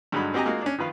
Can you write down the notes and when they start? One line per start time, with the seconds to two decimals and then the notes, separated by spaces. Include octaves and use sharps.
0.12 G2 D3 F#3 G#3 D#4 B5
0.34 C4 F#4 G4 D#5 G#5 A#5
0.46 G#3 A#3 D#4 F4 F#4
0.62 C#4 D4
0.78 D#3 F3 B4 F5